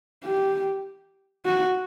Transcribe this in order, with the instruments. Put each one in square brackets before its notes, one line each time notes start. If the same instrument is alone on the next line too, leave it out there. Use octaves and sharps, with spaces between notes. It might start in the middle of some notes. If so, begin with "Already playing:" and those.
[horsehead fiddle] G4
F#4